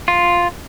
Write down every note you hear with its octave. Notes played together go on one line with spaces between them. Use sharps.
F4